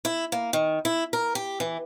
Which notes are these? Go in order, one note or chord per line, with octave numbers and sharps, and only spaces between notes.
E4
A#3
D#3
E4
A#4
G4
E3